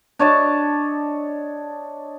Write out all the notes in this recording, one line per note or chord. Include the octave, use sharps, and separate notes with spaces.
D4 C#5 D#5 A5